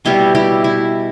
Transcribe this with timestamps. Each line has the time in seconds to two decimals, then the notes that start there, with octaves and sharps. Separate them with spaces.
0.05 B2 G3 B3 E4 G4
0.35 E4 G4
0.64 E4